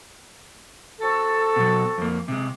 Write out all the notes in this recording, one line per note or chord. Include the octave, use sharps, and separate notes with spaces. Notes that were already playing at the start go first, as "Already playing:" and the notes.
C4 F#4 A4
B2 F#3
F2 A#3
C3 G#3